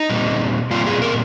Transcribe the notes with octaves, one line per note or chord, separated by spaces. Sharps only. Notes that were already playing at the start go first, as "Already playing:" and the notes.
Already playing: D#4
A#2 G3 C4
A#2 G3 C4 F4
G#4
A#4